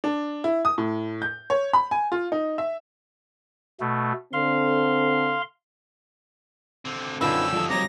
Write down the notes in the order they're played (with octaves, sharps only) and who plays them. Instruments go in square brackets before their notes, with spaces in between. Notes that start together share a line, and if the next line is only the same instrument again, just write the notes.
[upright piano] D4
E4
D#6
A2
G6
C#5
B5
G#5
F4
D#4
E5
[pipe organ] B2 A3
[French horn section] D3 C4 A4 [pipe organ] F5 C6
[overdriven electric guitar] D3 C4
[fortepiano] F#2 D3 [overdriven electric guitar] C4 C#4 [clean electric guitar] D#4 F4 B4 [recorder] E6
[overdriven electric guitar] G2 D#3 [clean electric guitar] F3 G3 A4
[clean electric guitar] F#3 C4 [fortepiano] C#5 A#5 D6 [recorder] A#6